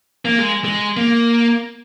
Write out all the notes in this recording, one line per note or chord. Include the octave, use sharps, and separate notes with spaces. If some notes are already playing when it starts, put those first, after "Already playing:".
A#3
G#3
G#3
A#3